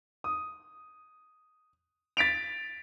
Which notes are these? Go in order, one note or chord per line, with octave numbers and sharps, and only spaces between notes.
D#6
A6 B6 D7 F7